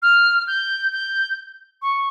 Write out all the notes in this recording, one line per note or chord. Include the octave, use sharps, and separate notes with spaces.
F6
G6
G6
C#6